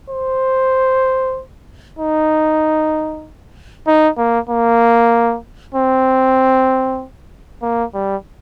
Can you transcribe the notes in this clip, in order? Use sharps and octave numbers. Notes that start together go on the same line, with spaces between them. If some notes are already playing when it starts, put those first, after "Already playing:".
C5
D#4
D#4
A#3
A#3
C4
A#3
G3